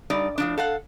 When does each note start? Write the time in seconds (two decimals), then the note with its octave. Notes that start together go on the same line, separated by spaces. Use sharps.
0.10 G2 G3 D#4 D5
0.38 A2 F3 D4
0.58 A4 F5 F#5